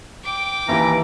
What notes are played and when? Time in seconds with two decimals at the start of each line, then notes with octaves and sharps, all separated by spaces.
0.24 G5 D6
0.69 D#2 E3 E4 G4 A#5